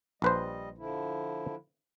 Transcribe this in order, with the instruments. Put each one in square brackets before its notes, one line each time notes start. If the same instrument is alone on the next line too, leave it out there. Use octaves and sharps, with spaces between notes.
[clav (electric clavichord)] A#1 B4 C5 [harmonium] G3 D#5
[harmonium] D3 F3 E4